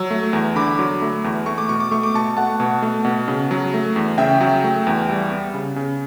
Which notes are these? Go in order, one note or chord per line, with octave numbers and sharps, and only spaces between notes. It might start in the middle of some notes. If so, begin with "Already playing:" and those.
Already playing: F#3 E6
A3
E2
D3 B5 D6
F#3
A3
E2
A3 C#6
D6
B2 C#6
D6
A3 C#6
D6
B2 A5 C#6
A3 F#5 A5
B2
A3
B2
C#3
F#3
A3
E2
C#3 E5 G5
F#3
A3
E2
G3
B3
C#3
C#3